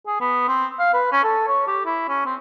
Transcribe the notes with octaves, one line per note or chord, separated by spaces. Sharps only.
G#4
B3
C4
F5
B4
C#4
A4
C#5
G4
E4
C#4
C4